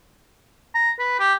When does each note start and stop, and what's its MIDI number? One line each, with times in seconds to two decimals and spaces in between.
0.75 0.91 82
0.99 1.17 71
1.20 1.34 67